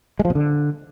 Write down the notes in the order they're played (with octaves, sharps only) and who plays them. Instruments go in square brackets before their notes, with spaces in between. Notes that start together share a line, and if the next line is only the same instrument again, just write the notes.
[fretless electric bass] G#3
F3
B2
D3